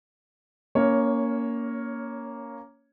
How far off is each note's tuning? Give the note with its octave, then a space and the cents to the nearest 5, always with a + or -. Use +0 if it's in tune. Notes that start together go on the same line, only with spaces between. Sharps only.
A#3 +0 C#4 +25 C#5 +0